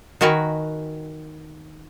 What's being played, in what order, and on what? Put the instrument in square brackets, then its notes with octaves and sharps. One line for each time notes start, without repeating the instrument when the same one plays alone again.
[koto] D#3 F#4 A#4 B4 G#5